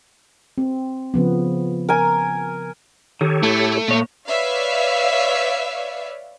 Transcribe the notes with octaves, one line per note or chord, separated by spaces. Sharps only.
C4
C#3 F3 B3
A#4 G#5
D#3 G4 A4 C#5
A2 A3
A#2 C#5
B4 C#5 D5 E5 F5